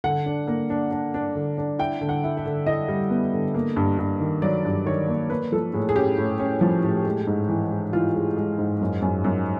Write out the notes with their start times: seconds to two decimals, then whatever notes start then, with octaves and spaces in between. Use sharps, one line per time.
0.04 D3 F#5
0.26 D4
0.47 A#3
0.70 D4
0.91 D4
1.14 D4
1.35 D3
1.58 D4
1.79 E4 G5
2.01 D3
2.09 F#5
2.24 E4
2.37 E5
2.46 D3
2.66 E4 D#5
2.88 G3
3.10 B3
3.33 D3
3.54 A#3
3.76 G2
3.98 G2
4.20 D#3
4.42 F#3 D5
4.65 G2
4.86 D#3 C#5
5.08 A#3
5.30 A#3 B4
5.52 F3 A4
5.73 A2 G#4
5.89 G#4
5.96 C#4 G4
6.18 A2
6.40 C#4
6.61 F3
6.83 A2
7.05 G#3
7.27 G#2
7.49 E3
7.70 G#3
7.93 E3 F4
8.15 G#3
8.37 G#3
8.58 G#2
8.81 F#2
9.02 F#2
9.24 F#2